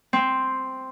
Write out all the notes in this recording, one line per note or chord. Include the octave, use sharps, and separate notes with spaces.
C4